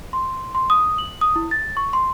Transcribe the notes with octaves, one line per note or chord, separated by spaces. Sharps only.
C6
C6
D#6
F#7
D#6
E4
A6
C#6
C6